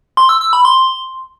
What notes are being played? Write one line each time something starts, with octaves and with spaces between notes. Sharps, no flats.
C6
E6
E6
B5
C6